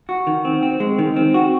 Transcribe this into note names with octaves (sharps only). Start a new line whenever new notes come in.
F#4
D#3
C4
C4
G#3
D#3
C4
F#4